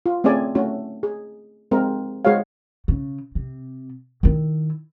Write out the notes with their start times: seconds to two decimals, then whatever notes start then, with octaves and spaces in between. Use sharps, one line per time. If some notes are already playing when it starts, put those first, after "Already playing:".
0.06 F4
0.24 A3 C4 C#4 G#4 D5 G#5
0.55 A3 C#4 F#4
1.03 G#4
1.71 G#3 C4 A#4
2.25 G#3 F#4 G#4 C5 C#5 F5
2.88 C#3
3.35 C3
4.23 D#3 E4